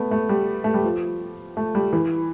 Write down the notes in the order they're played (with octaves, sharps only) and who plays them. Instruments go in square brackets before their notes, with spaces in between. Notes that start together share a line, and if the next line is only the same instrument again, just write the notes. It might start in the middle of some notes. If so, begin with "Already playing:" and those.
Already playing: [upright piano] A3 B3
A3
G3
A3
G3
F3
A3
G3
E3